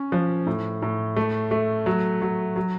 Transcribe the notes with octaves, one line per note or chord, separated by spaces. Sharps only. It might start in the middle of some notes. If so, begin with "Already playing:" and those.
Already playing: C#4
F3
A2
A2
A3
A3
F#3
F#3
F#3